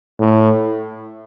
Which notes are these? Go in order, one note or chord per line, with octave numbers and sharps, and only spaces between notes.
A2